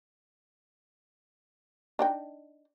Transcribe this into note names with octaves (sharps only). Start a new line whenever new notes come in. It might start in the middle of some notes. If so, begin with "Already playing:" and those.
D4 D#4 G5